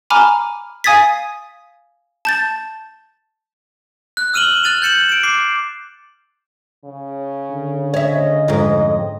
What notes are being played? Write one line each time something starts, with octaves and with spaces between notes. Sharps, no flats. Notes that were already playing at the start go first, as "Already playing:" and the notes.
G#5 A#5 B5 D6 F6
F5 G#5 D#6 G#6 A6 B6
A5 G6 A6
F#6
E6 F6 D#7 E7 F#7 G7
F#6 A6 D#7 F7
G6 A6 C#7 E7 F#7
D7 E7
D6 C7
C#3
D3
C#5 D#5 E5
F2 G#2 D#5